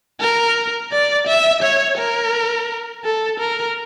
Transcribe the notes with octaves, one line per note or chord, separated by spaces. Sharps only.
A#4
D5
E5
C#5
A#4
A4
A#4